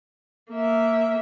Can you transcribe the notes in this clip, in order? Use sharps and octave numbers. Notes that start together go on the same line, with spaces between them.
A#3 E5